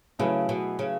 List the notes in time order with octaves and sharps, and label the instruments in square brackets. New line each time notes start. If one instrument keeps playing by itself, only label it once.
[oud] C#3 [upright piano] F#3 A3 E4 G#4 B4
[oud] B2
C#3